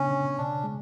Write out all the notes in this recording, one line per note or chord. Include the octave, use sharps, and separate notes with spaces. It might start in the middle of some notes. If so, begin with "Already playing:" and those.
Already playing: C#3 B3 C#4 D4
C#3
B2 D4
G#3